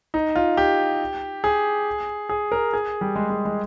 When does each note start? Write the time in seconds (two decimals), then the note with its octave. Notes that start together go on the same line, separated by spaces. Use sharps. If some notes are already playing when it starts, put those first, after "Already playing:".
0.14 D#4
0.35 F4
0.57 G4
1.44 G#4
2.29 G#4
2.52 A#4
2.73 G#4
3.01 G3
3.15 G#3
3.30 G#3
3.45 G#3